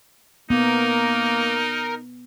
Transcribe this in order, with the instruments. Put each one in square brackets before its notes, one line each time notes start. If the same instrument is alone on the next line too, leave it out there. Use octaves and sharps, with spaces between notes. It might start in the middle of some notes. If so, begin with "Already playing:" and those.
[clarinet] A#3 [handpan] B3 [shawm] D#4 [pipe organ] A#4